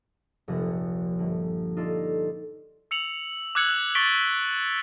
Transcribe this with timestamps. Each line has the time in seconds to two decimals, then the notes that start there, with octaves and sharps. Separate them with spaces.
0.48 F1 A#1 F3 A#6
1.19 G1
1.76 D#4 F4 A4 D5
2.91 E6 C#7 F7 F#7
3.55 D6 E6 F#6 G#6 C#7 F#7
3.95 C#6 D6 A6 B6 D7 G7